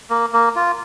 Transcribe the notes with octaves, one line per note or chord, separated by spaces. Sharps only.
A#3
A#3
F4